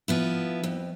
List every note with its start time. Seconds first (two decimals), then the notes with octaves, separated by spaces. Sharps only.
0.08 F3 B3 E4
0.63 F2